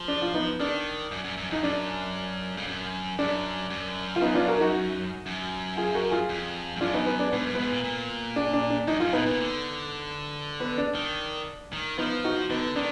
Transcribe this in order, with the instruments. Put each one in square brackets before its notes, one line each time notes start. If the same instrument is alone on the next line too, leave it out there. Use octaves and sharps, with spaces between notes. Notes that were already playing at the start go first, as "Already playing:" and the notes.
Already playing: [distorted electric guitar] F3
[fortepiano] D4
F4
B3 D#4
[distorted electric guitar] D#3 [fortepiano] D4
[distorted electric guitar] F#2
F#2
F#2
[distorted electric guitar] F2 [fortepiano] D#4
[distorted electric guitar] F#2 [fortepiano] D4
[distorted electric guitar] F2
F#2
[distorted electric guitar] F#2 [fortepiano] D4
[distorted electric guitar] F#2
[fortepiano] F4
B3 D#4
D4 F4
F#4 A#4
D#4 F#4
[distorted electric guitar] F#2
[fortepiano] F4 G#4
F#4 A#4
F4 G#4
[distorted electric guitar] F2
G#2
[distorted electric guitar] F#2 [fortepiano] D4 F4
[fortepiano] B3 D#4
B3
D4
[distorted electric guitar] G#2 [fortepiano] B3
[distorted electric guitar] F#2
[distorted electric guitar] G#2 [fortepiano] B3
[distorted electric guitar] A#2
A#2
[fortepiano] D4
D4
D4
[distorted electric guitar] F#2 [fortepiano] D#4
[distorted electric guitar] F#2 [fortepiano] F4
[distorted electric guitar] A#2 [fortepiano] B3 D#4
[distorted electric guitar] A#2
D3
[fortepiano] B3
D4
[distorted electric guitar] D#3
D#3
[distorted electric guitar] F3 [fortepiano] B3 D#4
[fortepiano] D#4 F#4
[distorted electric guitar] D3 [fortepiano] B3 D#4
[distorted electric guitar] D#3 [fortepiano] D4